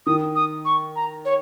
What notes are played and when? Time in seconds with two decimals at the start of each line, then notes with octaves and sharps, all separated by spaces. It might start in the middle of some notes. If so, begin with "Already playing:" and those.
0.06 D#3 D#6
0.35 D#6
0.65 C#6
0.95 A#5
1.25 C#5